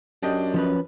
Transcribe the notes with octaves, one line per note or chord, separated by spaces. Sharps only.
F#2 D4 G4 D#5
F3 C#4 B4